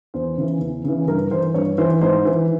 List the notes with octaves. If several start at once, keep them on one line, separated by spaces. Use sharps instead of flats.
E2 C5
C#3 E3
E2
C#3 E3
G2 A#4
E3 C5
G2 C#5
E3 C5
G#2 C5
E3